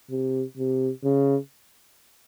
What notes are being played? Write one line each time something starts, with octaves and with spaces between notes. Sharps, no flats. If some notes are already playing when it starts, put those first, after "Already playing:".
C3
C3
C#3